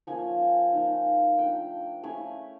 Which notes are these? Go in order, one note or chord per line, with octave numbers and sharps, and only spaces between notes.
F3 A#3 C#4 F4 G#5
F3 A#3 D#4
A3 D4 F4 G5
A3 C#4 E4 G#5